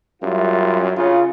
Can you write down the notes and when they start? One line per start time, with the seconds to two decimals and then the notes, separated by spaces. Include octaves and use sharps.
0.23 F#2 G3 E4 F4
0.97 C#3 F4